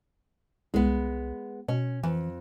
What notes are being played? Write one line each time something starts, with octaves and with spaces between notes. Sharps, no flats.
C2 G#3 B3
B2 C#4
F2 E3